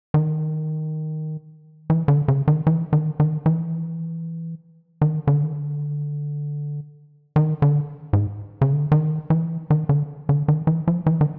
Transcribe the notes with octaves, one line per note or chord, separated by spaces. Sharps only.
D#3
E3
D3
C#3
D#3
E3
D#3
D#3
E3
D#3
D3
D#3
D3
D#3
D3
G#2
C#3
D3
D#3
E3
D#3
D3
D3
D#3
E3
F3
E3
D#3